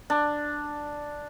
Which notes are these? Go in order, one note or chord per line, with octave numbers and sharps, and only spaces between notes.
D4